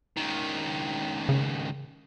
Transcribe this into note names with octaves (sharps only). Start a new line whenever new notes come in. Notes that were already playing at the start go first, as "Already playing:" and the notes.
C#2 D#3
C#3